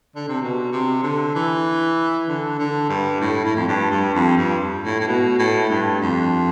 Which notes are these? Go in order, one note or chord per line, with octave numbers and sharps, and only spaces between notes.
D3
C3
B2
C3
D3
E3
D3
D3
G2
A2
A2
F2
G2
G2
F2
G2
A2
A2
B2
A2
G2
F2